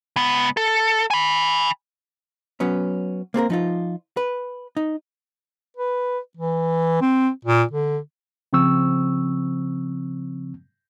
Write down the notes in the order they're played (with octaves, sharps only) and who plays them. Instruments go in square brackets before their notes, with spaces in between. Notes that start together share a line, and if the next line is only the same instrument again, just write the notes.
[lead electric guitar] C#2 B3
A4
G#5 B5
[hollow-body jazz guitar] F#3 B3 C#4
A#3 C4 A4 A#4
F3 D#4 F4
B4
D#4
[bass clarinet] B4
E3
C4
A#2
D3
[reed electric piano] C#3 F3 C4 C#6 E6